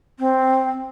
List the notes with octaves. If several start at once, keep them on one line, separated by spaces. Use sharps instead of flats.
C4